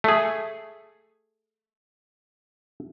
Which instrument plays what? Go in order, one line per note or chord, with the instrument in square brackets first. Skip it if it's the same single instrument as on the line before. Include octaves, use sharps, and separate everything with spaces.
[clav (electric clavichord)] A3 G#4